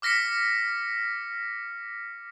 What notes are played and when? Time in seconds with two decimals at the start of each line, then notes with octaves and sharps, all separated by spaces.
0.02 D6 F6 A#6 B6 C#7